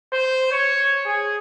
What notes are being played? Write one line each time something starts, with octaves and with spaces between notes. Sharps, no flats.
C5
C#5
G#4